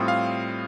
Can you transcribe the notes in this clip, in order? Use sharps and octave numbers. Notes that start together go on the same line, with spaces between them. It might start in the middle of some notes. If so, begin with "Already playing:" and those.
Already playing: A2 G3 C4 F4 D#6
F5